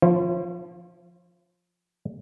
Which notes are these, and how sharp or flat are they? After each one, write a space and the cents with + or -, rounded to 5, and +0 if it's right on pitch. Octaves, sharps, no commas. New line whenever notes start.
F3 +5 F4 -45 C5 +45